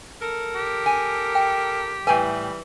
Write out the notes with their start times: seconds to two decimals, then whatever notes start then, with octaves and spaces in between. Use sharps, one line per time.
0.21 A4 A#4
0.55 G4
0.86 G#5
1.35 G5
2.07 A2 E3 G3 B4 G5 G#5